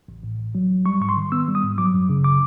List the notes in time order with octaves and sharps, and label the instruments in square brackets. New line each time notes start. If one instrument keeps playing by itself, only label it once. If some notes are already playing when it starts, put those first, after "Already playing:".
[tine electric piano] A1
A2
A1
F#3
A1
G3 C#6
G#2 C#6
C6
D#3
B3 E6
G3
D#6
G#2
F#3 D6
F#2
C#3
D6